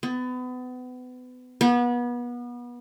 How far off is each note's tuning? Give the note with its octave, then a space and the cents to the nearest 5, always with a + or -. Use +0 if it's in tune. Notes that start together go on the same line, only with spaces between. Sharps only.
B3 +30
B3 -30